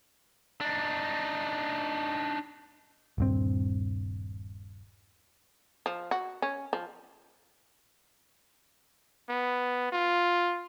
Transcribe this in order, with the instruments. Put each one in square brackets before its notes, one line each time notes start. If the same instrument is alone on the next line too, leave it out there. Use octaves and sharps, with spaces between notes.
[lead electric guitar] D4 D#4
[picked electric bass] D#1 G2 C4
[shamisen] F3
F#4
C#4
F3
[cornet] B3
F4